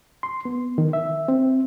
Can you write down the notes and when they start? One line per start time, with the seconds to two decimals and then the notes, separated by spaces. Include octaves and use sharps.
0.23 C6
0.45 B3
0.78 D#3
0.93 E5
1.28 C4